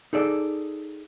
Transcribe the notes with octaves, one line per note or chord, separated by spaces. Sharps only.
D#4 G#4 A4 D5